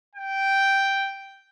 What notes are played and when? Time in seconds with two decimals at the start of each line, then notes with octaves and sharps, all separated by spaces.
0.15 G5